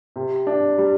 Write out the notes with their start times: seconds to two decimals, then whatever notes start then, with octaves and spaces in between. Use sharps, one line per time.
0.16 C3
0.47 D4
0.78 G3